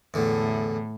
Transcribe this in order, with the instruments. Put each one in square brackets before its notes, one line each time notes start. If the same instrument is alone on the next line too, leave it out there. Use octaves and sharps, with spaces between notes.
[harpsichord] E2 D3 [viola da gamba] A2